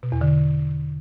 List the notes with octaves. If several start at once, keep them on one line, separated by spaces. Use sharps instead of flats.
B2
E2
D3